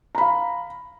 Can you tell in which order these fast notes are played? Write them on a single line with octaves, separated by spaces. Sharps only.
A#5 B5 F5